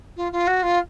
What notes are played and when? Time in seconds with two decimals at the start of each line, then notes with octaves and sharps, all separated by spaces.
0.17 F4
0.32 F4
0.47 F#4
0.63 F4